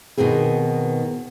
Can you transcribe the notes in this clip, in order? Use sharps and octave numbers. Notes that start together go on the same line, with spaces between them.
B2 D#3 B3 C4 G#4